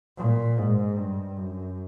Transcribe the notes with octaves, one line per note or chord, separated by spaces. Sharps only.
A#2
G#2
G2
F#2